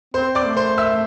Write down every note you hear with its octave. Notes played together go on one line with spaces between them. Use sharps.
C4 C5 C6
D5 D6
A3
C5 C6
E5 E6